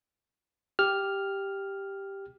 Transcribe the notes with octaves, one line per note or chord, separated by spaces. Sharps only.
G4 F6